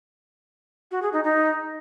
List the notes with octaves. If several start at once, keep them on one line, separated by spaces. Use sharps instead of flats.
F#4
G#4
D#4
D#4